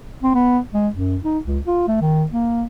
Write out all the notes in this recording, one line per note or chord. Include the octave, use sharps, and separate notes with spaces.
C4
B3
G#3
F#2
D#4
C#2
F4
A3
D#3
A#3